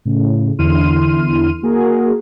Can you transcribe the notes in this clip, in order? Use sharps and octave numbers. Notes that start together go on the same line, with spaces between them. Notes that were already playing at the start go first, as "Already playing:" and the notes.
A2 C#3
E2 D3 E4 C6 F6 D#7
A#3 F#4 G#4 A#4